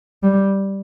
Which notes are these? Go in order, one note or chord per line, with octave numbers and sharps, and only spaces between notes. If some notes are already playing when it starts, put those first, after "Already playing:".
G3